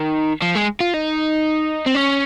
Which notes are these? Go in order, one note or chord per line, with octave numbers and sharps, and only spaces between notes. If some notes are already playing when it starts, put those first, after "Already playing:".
Already playing: D#3
F3
G#3
F4
D#4
C4
C#4